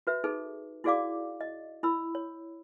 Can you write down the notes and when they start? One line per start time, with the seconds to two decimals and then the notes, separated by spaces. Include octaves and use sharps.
0.07 F#4 B4 E5
0.24 D#4 G#4 A4 B4
0.84 E4 F#4 G#4 D5 F5 D6
1.41 D#5
1.83 E4 B5 E6
2.15 C#5